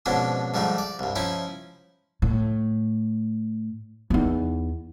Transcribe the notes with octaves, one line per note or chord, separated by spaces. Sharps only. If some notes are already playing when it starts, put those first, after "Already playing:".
F2 G#2 B2 F3 C#4 D4
G#2 F3 G3 A3 D#4
D5
C2 G2
F3 C#4 D#4 E4
A2
E2 D#4